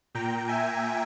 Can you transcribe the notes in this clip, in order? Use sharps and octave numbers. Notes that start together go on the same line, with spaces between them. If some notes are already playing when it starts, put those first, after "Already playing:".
A#2 G5 A#5
E5 G#5